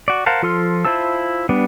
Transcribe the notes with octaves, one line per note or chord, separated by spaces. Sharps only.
F#4 D5
A#4 C5 F5 F#5 A5
F3 F4 A4 C6 F6
E4 F4 C5 A5 E6
G3 B3 D4